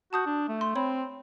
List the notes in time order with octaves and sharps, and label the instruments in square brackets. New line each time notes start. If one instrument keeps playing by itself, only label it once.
[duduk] F#4 [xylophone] A5 D#6 G6
[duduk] D4
A3
[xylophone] C6
[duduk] C4 [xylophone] C#5 B5